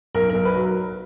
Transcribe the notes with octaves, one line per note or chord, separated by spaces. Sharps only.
B1 A#4
A#4
B1
B4
F#3